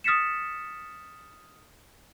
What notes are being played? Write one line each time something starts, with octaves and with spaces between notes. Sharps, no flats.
D#6 F6 A6 B6 C#7 E7